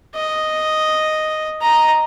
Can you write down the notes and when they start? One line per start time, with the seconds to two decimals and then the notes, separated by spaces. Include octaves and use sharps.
0.15 D#5
1.61 D#5 A#5